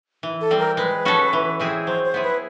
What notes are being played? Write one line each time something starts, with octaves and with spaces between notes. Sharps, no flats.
E3
A4
G3 C4
A#4
G#3 B4
C#4 F#4 A4
E3
G#3 C4 E4 G#4
F#3 C5
C5
B3 E4 G#4
B4